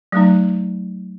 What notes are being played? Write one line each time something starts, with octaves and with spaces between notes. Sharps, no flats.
F#3 A3 D#4